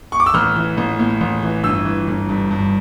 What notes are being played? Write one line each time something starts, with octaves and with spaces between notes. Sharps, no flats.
C#6
D6
E6
A1 F6
E3
A1
A2
A1
E3
G1 E6
E3
G1
G2
G2